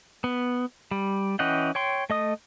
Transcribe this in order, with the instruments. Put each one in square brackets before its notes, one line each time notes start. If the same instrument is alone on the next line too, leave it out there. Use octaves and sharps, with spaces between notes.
[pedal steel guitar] B3
G3
E3 C#4 D#5 F#5 G5
C#5 G5 C6
A3 D#5 D#6